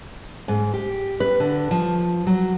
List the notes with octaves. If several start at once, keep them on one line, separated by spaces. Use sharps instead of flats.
G#2
G4
B4
D3
F3
F#3